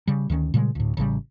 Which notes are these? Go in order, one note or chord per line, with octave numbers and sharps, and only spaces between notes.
C#3 G3
D2 D#3 E3 C#4
A#2 C#3 G3 G#3
D2 A2
A1 C#3 F3 G3